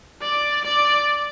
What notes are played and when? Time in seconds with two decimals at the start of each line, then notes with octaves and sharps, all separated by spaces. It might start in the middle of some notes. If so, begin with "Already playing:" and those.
0.21 D5
0.64 D5